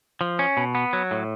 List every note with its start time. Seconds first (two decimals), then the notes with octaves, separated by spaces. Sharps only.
0.21 F3
0.39 C#4
0.57 B2
0.75 B3
0.93 F#3
1.11 A2